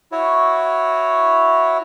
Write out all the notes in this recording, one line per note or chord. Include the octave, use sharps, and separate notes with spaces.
E4 F#4 C#5